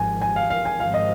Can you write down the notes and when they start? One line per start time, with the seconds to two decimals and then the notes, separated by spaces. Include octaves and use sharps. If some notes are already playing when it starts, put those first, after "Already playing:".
Already playing: G#1 G#2 F3 G#5
0.22 G#5
0.36 F5
0.50 F5
0.65 G#5
0.80 G#1 G#2 F3 G#3 C4 F5
0.94 D#5